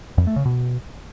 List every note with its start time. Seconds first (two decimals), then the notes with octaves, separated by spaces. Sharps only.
0.18 F2
0.27 A3
0.36 C#3
0.45 B2